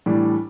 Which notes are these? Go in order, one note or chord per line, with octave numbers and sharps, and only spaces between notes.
A2 E3 G3 D4